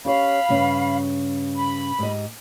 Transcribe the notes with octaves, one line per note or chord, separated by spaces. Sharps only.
C#4 G4 C#5 F5 B5
G2 C#3 C#4
B5
G#2 G4 D#5